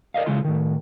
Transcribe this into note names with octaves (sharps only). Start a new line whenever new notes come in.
A#4 D5 D#5 F5
C#3 E3 G#3 F4 C6
A2 D#3